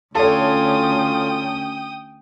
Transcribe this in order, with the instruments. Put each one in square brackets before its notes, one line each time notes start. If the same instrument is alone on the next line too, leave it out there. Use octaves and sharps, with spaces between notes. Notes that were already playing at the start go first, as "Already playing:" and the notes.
[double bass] D2 C#4 [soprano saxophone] F4 [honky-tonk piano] A4 C#5 [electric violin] G5 D#6